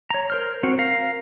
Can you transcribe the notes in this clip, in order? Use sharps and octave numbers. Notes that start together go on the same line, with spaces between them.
C#5 A#5
A#4 C5 F6
C4 F#4
A#4 F5